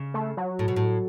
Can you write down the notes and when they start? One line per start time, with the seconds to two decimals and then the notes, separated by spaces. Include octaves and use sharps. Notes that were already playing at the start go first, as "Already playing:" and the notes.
Already playing: C#3
0.14 A3
0.37 F#3
0.59 A2
0.68 B2
0.76 A2